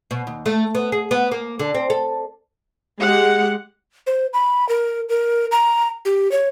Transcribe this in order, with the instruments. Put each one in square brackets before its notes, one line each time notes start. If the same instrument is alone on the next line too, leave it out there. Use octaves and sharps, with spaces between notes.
[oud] B2
D#2
A3
B3
G#4
B3
A#3
D3
C4
A4
[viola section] G#3 G4 F#5
[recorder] C5
B5
A#4
A#4
A#5
G4
C#5